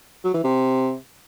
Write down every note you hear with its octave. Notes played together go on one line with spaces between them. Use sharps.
F#3
E3
C3